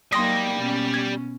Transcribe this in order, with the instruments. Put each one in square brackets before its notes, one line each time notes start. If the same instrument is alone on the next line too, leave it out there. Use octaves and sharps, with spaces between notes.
[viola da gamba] F#3 A#3 D#4 [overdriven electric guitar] G3 G5 [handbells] C6 D#6 [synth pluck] A#6
[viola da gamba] B2 C#4
[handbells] G#6